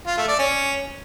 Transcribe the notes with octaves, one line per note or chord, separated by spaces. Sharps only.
F4
A3
D5
C#4